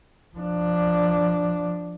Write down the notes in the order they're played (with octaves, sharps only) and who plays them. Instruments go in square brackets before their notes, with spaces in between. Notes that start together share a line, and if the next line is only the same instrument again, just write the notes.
[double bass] F3 D4